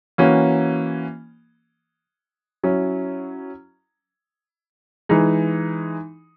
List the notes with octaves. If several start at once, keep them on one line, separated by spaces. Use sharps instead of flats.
E3 A#3 C#4 F#4
F#3 C#4 E4
E3 G#3 D#4